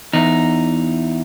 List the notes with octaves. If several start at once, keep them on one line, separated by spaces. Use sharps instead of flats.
E2 D#4